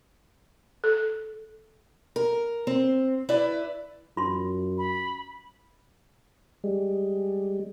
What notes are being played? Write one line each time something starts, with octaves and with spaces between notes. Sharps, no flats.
A4
A#4
C4
E4 B4 D5
F#2 F4 C6
B5
G3 G#3